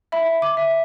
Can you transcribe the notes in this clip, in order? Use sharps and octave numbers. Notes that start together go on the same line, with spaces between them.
E5 B5
D6
E5